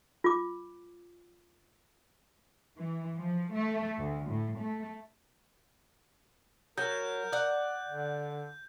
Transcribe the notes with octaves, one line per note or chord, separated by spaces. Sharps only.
F4 D6
E3
F3
A3
D2
A2
A3
F#3 A#4 G6
D5 F#5
D3